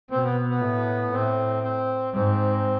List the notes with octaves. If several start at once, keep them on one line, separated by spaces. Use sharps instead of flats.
B2 C4
B3
B3
A2
A2 C4
C4
G#2 C4